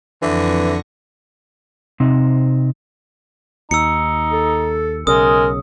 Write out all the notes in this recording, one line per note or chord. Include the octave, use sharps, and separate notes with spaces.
F2 D3 E3 C#6 A#6
C3 C4 D#4
D#2 D#4 E6 C#7
A4
B1 C#3 G#3 A#4 D#6